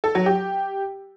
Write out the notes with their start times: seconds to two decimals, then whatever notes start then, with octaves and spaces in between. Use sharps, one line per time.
0.04 A4
0.15 F#3
0.26 G4